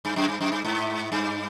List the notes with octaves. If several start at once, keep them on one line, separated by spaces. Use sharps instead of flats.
G2
F#2
G2
F#2
G2
G#2
G2